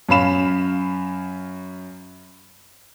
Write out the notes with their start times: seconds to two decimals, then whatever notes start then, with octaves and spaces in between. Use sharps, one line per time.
0.09 F#2 C#4 F5 B5 E7